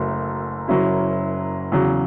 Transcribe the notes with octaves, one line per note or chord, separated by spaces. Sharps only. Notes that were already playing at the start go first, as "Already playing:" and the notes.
Already playing: F#1 F#2 F#3 A3
F#1 F#2 F#3 C#4 E4
E2 C#3 F#3